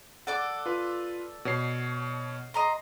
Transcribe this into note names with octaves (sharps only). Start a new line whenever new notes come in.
A4 D5 F#5 D6
F4 B4
B2 C#5 C7
D#5 A#5 C6